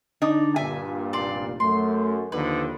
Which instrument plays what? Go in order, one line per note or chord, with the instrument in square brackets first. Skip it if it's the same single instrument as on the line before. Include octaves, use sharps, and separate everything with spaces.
[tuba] D3 [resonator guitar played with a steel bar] D4 D#4
[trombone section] G2 A#2 [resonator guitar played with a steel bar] E5 G#5
[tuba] F1 [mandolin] D5 C6
[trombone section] F#2 [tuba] A3 [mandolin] C6
[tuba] D#2 [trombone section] D3 D#3 F3 [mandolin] B4